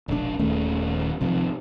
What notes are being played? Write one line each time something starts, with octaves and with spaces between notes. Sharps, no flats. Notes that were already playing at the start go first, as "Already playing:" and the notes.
E1 A#1 B2 D4
D#1 D#2 A3 C#4
G#1 C3 F3